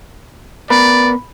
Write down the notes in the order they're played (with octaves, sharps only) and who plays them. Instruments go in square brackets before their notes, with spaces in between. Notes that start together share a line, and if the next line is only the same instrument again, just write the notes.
[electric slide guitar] B3 A#4 B4 [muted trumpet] D5 [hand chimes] B5